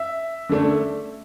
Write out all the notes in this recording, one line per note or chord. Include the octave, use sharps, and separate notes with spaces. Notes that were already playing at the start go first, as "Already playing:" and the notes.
Already playing: E5
D3 A3 D4